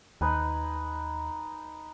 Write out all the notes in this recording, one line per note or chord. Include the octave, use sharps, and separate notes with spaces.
D#2 D#4 B4 G#5